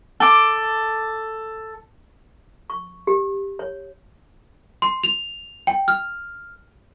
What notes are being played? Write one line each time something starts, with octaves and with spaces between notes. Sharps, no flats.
A4 D6
C#6
G4
C#5
C6
F7
G5
F6